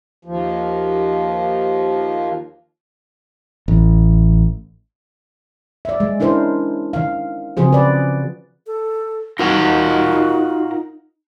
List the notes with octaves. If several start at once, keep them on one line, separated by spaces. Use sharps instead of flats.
D#2 F3
A1
D5 E5
G#3
C#4 D4 E4 A#4 C5
D#3 F5
C#3 F3 C4 F#4 G#4 C5
B4 D5
A4
D#4 F4 F#4 A#4 F#5